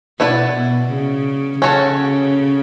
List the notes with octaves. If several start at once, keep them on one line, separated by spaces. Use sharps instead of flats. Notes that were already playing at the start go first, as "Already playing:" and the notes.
B2 B3 E4 B4 D5
B2
C#3
C#3 C#4 F#4 A4